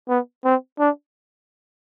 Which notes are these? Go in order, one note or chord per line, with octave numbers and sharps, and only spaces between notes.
B3
C4
D4